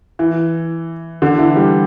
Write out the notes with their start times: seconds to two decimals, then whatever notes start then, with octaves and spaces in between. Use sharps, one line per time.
0.19 E3
1.22 D3
1.39 E3
1.56 G3